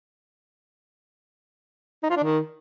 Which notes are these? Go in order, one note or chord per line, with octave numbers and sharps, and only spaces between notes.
D#4
F4
D4
D#3